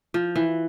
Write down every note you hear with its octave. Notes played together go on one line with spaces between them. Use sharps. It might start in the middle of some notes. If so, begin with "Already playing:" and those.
F3
E3